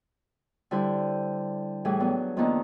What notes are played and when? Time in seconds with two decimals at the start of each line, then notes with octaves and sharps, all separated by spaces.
0.71 D3 G3 E4 C5
1.85 A2 E3 G3 G#4
2.00 F#3 B3 D4
2.37 F2 D#3 A#3 B3 D4 D#4